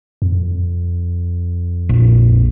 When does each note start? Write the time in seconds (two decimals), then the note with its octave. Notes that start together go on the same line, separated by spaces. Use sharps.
0.22 F2
1.89 A#1